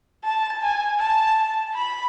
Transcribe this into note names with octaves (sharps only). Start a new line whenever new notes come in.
A5
G#5
A5
B5